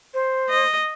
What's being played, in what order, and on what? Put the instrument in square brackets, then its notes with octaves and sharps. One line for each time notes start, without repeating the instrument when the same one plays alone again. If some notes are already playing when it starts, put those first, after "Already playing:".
[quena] C5
[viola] D#5